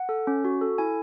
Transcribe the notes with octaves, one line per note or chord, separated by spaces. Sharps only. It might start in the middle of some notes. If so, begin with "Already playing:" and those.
Already playing: F#5
A4
C#4
F#4
A4
E4 G#5